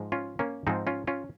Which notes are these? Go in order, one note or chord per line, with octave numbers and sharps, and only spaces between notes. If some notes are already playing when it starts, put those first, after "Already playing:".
Already playing: G#2 F3 G#3
C#4 F4
A#3 C#4
G#2 F3 G#3 C4 D#4
C#4 F4
C#4 F4